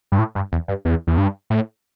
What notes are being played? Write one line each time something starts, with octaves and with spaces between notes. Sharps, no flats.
G2
A2
G2
E2
G2
E2
E2
G2
A2